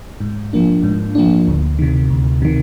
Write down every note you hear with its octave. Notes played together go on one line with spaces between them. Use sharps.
G#2
F3 A#3 D4
G#2
F3 A#3 D4
D2
C3 D#3
D2
C3 D#3